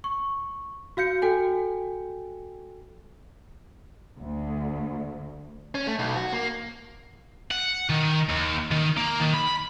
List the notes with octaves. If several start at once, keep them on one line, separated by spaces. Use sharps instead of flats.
C#6
F#4 F5 G6 C#7
F#4 A4 G5 G#5
D2
C#4
A3
B1
F#4
A#3
F#5
D#3
D#2
D#3
A#3
D#3
B5